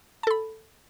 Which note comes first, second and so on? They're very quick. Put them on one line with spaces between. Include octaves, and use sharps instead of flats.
A5 A4 B5